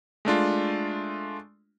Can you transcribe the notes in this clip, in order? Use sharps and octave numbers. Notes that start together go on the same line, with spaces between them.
G#3 A3 D4 F4